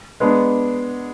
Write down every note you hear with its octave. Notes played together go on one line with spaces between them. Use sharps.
G#3 B3 D4